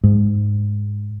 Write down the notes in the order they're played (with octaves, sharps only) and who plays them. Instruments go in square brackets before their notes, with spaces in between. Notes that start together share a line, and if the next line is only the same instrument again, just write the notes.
[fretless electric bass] G#2